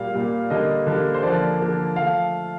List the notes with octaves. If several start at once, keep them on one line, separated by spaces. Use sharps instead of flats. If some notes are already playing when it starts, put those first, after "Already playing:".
Already playing: A#2 G3 A#3 F5
A#2 G3 A#3
D3 G3 A#3 D#5
D3 G3 A#3
C5
D3 F3 A#3 D5
D3 F3 A#3
F3 A3 F5